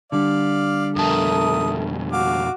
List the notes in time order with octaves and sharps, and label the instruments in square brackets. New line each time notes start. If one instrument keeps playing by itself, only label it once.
[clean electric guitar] D3 G3 [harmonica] D5 F5
[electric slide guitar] F2 B2 A5 [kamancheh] A3 A#4 [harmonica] D#6
[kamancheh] F#4 [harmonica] F5 D6